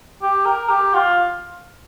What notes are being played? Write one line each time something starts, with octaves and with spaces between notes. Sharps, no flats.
G4
A#4
G4
F4